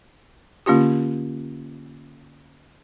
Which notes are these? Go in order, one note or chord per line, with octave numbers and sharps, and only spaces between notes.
D3 A#3 C#4 F4 G4